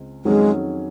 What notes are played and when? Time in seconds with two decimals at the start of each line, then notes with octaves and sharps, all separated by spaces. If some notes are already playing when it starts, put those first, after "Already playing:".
Already playing: C#2 C4
0.25 F2 D#3 F#3 G#3 C#4 G#4